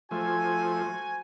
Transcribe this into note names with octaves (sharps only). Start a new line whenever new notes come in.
F3 A3 F#4 C5 G#5